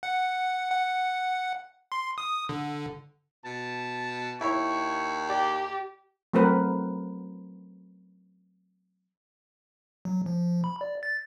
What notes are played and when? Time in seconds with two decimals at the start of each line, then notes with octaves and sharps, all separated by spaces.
0.03 F#5
0.71 F#5
1.92 C6
2.18 D#6
2.49 D3
3.45 B2 A5
4.41 D#2 E4 C#5 C#6
5.29 G4 D5
6.33 F#3 A3 C4 F#4 A#4 B4
10.05 F#3
10.26 F3
10.64 B5
10.81 D5
11.03 A6